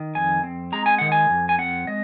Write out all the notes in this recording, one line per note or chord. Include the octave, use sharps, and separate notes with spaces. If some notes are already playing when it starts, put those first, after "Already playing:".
Already playing: D#3
F2 G#5
C4
G#3 A#5
G#5
D#3 F#5
G#5
F2
G#5
C4 F#5
G#3 D#5